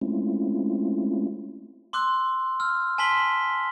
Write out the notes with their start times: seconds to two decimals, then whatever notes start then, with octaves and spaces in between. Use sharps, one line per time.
0.01 G#3 A3 C4 C#4 E4 F4
1.93 C6 D6 E6 F#6
2.60 E6 F6
2.98 G#5 A5 C6 B6 F#7 G7